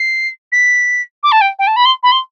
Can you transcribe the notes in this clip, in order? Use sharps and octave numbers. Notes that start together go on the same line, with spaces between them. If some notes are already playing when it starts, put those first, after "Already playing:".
Already playing: C7
B6
D6
A5
G5
G5
A5
B5
C6
B5
C6